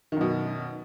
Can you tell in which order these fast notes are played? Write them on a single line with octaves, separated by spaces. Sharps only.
D#3 F#2 B2